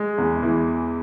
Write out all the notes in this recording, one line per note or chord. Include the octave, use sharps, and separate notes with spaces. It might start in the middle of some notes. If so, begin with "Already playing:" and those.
Already playing: G#3
E2
E3